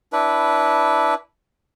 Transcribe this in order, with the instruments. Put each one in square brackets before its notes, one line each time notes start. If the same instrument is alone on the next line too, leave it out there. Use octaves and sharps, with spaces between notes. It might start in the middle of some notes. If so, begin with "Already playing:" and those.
[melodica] D4 E4 B4